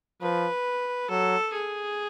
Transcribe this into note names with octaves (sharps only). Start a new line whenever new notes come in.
F3 B4
F#3 A4
G#4